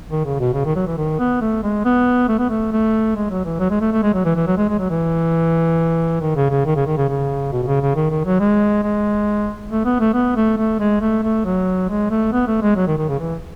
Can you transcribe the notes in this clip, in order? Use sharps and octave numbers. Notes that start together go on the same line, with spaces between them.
D#3
C#3
B2
C#3
D#3
F#3
E3
D#3
B3
A3
G#3
B3
A3
B3
A3
A3
G#3
F#3
E3
F#3
G#3
A3
A3
G#3
F#3
E3
E3
F#3
G#3
G#3
F#3
E3
D#3
C#3
C#3
D#3
C#3
D#3
C#3
C#3
B2
B2
C#3
C#3
D#3
D#3
F#3
G#3
G#3
A3
B3
A3
B3
A3
A3
G#3
A3
A3
F#3
G#3
A3
B3
A3
G#3
F#3
D#3
D#3
C#3
E3